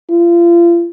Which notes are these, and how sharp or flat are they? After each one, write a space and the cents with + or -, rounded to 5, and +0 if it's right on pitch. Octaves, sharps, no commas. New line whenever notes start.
F4 -35